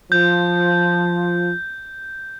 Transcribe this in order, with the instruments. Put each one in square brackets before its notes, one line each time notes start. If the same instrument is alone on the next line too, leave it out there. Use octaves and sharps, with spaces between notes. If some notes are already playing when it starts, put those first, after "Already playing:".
[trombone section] F3 [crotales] G6